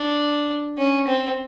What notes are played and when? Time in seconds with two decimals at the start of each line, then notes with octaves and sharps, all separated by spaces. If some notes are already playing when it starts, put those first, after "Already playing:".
Already playing: D4
0.78 C#4
1.07 C4